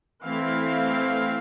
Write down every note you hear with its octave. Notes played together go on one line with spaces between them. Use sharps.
E3 A3 C4 E4 F5